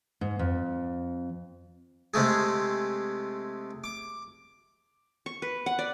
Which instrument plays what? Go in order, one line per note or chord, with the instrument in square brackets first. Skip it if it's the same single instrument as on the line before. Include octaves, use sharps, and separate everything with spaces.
[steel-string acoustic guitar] G#2
F2
[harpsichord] C3 G#3 A3 G#4
D6
[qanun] C#6
B4
F#5
D5